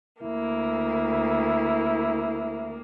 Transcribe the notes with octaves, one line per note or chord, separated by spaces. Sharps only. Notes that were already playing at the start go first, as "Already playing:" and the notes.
D2 A#3 E4